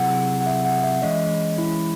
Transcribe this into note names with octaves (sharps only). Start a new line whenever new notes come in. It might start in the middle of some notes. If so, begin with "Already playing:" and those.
Already playing: C3 F#3 C4 E4 G#4 F#5
F#5
E5
F#5
E5
E3 G#3 C#4 D#5
E4